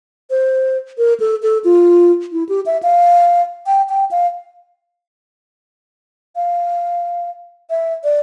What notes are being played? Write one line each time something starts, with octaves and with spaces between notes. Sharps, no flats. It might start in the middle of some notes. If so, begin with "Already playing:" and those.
C5
A#4
A4
A4
F4
E4
G4
E5
F5
G5
G5
F5
F5
E5
D5